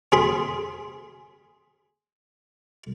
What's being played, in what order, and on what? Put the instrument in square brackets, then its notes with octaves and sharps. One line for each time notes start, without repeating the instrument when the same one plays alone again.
[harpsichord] C4 G#4 B5 C6